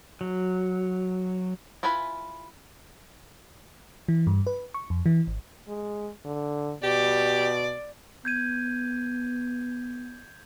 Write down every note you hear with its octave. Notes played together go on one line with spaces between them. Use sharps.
F#3
E4 F4 B4 G#5 B5
E3
G2
B4
C#6
F2
E3
G#1
G#3
D3
B2 G4 D5
B3 G6 G#6 D#7